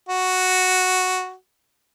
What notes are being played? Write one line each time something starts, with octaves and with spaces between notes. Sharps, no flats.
F#4